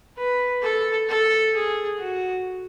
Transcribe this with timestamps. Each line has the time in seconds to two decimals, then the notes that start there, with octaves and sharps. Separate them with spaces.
0.17 B4
0.62 A4
1.09 A4
1.54 G#4
1.99 F#4